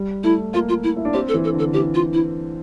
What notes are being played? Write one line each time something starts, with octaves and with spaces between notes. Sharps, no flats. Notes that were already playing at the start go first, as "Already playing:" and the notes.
Already playing: G3
A3 E4
A#3 F4
F4
E4
E4
D4
C4 G4
A4
E3
A4
D3
A4
E3 G4
F4
E4